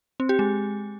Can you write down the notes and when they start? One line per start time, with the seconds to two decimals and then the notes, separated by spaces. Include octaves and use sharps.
0.20 C4
0.29 G4
0.39 G#3